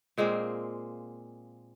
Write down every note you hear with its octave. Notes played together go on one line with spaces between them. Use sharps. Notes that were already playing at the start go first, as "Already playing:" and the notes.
A#2 G#3 A#3 C4